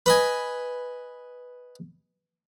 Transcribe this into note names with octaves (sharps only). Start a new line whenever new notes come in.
B4 D#5 G#5